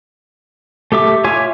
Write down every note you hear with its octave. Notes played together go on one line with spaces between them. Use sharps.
A3 G4 E5 D6
F4 C#5 E5 G#5 D6